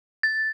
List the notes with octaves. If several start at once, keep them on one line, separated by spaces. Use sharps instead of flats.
A6